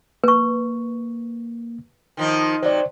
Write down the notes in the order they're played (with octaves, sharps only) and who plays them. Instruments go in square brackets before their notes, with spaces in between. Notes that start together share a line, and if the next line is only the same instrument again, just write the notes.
[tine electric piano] A#3 [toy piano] B4 C#6
[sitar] D#3 F3 D#4
[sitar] C3 F#3 [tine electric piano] C5 D5